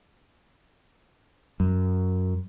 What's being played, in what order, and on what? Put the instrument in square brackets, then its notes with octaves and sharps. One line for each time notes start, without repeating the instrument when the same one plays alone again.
[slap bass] F#2